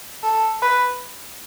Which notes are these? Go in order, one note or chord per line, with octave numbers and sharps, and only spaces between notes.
A4
B4